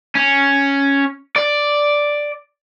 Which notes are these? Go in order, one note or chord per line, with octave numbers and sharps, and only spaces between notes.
C#4
D5